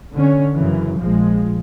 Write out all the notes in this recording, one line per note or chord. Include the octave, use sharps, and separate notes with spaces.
D3 C#4
F#2 C#3 E3
A#1 F3 G#3